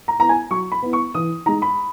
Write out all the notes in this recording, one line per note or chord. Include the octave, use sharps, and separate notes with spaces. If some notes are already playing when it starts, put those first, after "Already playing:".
A#5
B3 E4 A#5
G#5
F#3 C#6
B5
B3 E4
C#6
E3 D#6
G#3 D#4 A#5
B5